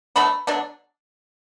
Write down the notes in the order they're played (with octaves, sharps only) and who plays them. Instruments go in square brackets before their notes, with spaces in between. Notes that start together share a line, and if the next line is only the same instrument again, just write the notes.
[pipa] B2 F#3 A3 D4 B5
B2 F#3 A3 D4